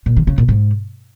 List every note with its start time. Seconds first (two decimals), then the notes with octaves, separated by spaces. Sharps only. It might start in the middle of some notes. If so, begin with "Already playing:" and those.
0.06 A#2
0.17 D#3
0.27 C#3
0.38 A#2
0.48 G#2